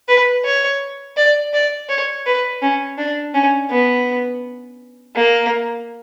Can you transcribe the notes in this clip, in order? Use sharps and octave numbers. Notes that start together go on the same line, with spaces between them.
B4
C#5
D5
D5
C#5
B4
C#4
D4
C#4
B3
A#3